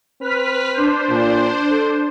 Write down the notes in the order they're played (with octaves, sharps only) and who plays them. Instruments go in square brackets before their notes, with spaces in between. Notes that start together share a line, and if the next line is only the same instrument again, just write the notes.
[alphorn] C4 [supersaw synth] B4 F6 B6
[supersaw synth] D4 C5
[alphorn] A#2
A4